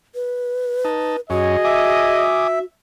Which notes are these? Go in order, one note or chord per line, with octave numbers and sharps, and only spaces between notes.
B4
D#4 A5
F#2 C#4 F#4 G#4 D#5
E5 G#5 D6 D#6